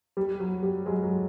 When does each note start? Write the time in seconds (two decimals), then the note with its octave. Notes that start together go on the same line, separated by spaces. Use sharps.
0.17 G3
0.40 F#3
0.63 G3
0.86 F#3 G#3
1.03 F#3